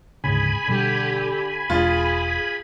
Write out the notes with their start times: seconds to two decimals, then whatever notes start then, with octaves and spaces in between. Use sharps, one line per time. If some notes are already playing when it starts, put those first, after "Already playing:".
0.24 D2 G#2 C#3 G#4 G#5 B5
0.68 B2 D3 G3 G4
1.70 E1 G#3 D4 F4 G#4